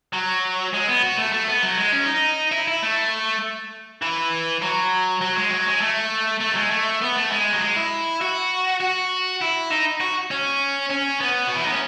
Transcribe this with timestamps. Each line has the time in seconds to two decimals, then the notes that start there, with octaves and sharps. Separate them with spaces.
0.13 F#3
0.73 G#3
0.88 B3
1.03 F#4
1.18 A3
1.33 A3
1.48 B3
1.63 F#3
1.77 G#3
1.93 C#4
2.07 D#4
2.52 E4
2.68 E4
2.82 A3
4.02 E3
4.62 F#3
5.22 F#3
5.36 G#3
5.52 F#3
5.67 G#3
5.81 A3
6.41 A3
6.52 F#3
6.56 G#3
6.71 A3
7.02 B3
7.16 A3
7.31 G#3
7.53 F#3
7.61 G#3
7.76 E4
8.21 F#4
8.81 F#4
9.41 E4
9.71 D#4
10.01 F#4
10.31 C#4
10.91 C#4
11.21 B3
11.47 F#4
11.56 E4
11.64 D#4
11.72 C#4